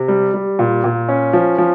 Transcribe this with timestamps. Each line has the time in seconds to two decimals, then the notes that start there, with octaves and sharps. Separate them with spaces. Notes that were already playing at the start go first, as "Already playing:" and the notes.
Already playing: C3
0.08 G3
0.34 G3
0.59 A#2
0.84 A#2
1.09 C#4
1.33 F3
1.58 F3